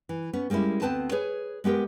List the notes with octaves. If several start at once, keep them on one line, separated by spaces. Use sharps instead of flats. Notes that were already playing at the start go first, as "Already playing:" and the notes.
E3
B3 C#4
G3 G#3 A#3 C#4 E4
D2 B3 C4 B4 A5
G#4 B4 C#5
G#3 B3 G4 A#4